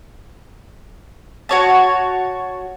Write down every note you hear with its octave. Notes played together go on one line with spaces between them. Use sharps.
F#4 C#5 A5